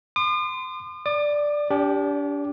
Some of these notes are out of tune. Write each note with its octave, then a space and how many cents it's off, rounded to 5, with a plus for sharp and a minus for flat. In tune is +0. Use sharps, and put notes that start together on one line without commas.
C6 -25 D#6 -45
D5 +0 D6 +45
D4 -35 G4 +0